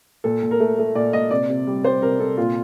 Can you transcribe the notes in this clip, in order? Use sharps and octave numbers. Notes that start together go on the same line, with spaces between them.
A#2 A4
A#2
A#4
A3
A3
A#2 D5
A#2 D#5
C3 D5
C3
G3
G3 C5
C3 A#4
C3 A4
A#2 F4